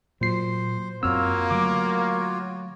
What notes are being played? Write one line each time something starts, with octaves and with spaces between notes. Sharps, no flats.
A#2 F#3 C5 C7
F#2 A#3 C4 F4 F#4 C#5 E6 F6
D3 F#3 A3 D6